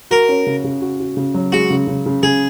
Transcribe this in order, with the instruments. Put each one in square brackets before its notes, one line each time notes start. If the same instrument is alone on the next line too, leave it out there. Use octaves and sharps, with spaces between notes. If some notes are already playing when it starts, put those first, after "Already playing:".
[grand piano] F#4 [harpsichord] A#4
[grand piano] C#4
C#3
C#3
F#4
F#4
C#3
F#3
[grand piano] G#3 [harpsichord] F#4
[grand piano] C#3
C#3
C#3
[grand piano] C#3 [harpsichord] G#4